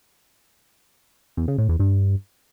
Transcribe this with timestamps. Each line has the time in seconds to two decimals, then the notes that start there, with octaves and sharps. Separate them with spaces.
1.37 E2
1.48 C#3
1.58 A2
1.69 E2
1.79 G2